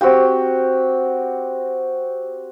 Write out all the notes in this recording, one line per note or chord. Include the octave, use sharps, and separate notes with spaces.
C4 F#4 G4 G5